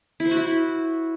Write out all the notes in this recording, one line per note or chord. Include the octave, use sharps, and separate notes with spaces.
E4
C5
F#4
E4